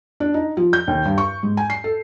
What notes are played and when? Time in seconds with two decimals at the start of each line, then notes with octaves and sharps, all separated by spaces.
0.20 D4
0.34 D#4
0.57 F3
0.73 G6
0.88 D#2
1.05 G2
1.18 C#6
1.43 G#2
1.57 G#5
1.70 C7
1.84 A4